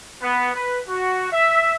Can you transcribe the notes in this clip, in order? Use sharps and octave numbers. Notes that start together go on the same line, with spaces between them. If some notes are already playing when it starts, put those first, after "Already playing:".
B3
B4
F#4
E5